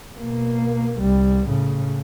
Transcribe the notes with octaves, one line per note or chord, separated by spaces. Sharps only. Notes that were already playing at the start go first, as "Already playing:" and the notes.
B2 A#3
C2 G3
A2 C#3